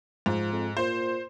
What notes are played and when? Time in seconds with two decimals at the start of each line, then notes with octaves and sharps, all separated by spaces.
0.26 G#2 F3
0.52 F2
0.77 A#2 C5